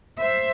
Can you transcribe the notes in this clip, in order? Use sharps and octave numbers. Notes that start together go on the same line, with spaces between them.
C5 E5